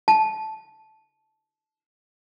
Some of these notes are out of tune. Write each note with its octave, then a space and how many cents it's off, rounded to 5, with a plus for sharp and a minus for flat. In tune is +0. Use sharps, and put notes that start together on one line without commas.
A5 -15